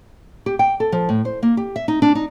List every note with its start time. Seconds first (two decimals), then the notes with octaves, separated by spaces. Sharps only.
0.46 G4
0.59 G5
0.80 A4
0.92 F3
1.09 A2
1.25 C5
1.43 A#3
1.57 G4
1.76 E5
1.88 D#4
2.02 D4
2.15 D#4